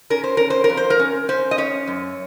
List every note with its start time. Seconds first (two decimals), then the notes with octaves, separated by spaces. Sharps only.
0.10 C#4 A#4
0.24 C5
0.37 C#4 A#4
0.50 C5
0.64 A#4
0.70 F2
0.77 C5
0.90 A#4
0.99 C#4
1.29 C#4 C5
1.51 D#5
1.58 C#4 C#5
1.88 F#2